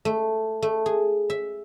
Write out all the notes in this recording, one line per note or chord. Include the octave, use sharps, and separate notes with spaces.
A3
A3
G#4
E5